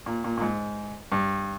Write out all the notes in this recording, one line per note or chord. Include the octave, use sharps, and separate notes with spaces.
A#2
A#2
A#2
G#2
G2